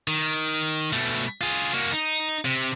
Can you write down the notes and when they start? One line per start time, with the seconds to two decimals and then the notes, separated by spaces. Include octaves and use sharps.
0.08 D#3
0.93 B2 A3
1.41 F4 G#4
1.73 A#3 F#4
1.91 D#4
2.45 C3